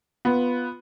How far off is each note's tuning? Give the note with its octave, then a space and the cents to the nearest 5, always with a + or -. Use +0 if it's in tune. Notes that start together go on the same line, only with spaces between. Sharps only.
B3 +0 F4 +0